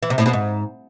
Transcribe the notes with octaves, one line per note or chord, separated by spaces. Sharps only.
E3
C3
A2
B2
G#2